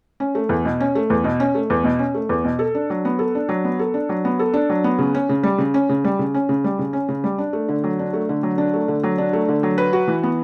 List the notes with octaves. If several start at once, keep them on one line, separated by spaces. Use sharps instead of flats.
C#4
A3
E2
B2
C#4
A3
E2
B2
C#4
A3
E2
B2
C#4
A3
E2
B2
A4
D4
F#3
B3
A4
D4
F#3
B3
A4
D4
F#3
B3
A4
D4
F#3
B3
C#3
C#4
C#3
G3
C#3
C#4
C#3
G3
C#3
C#4
C#3
G3
C#3
C#4
C#3
G3
D4
A3
D3
F#3
D4
A3
D3
F#3
D4
A3
D3
F#3
D4
A3
D3
F#3
B4
F#4
E3
B3